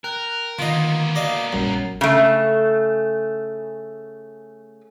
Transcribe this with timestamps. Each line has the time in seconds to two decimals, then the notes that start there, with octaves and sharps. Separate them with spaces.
0.04 A#4 G5 F#6
0.59 D3 D#3 A#3 B3 F4 D#5
1.15 F#4 D5 D#5 F5
1.53 A#1 F#2 G3 C7
2.01 C#3 A3